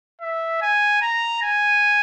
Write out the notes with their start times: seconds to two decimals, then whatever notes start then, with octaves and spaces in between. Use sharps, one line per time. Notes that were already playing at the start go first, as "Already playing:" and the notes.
0.21 E5
0.62 G#5
1.02 A#5
1.42 G#5